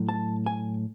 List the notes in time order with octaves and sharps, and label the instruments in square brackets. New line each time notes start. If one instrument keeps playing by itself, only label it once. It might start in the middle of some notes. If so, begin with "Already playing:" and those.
Already playing: [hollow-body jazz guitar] A2 F#3
A5
G#5